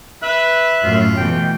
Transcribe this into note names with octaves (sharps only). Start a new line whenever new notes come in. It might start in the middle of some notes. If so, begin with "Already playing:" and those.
B4 E5 F#6
F#2 A2 F#3 F4
B2 E3 A3 G5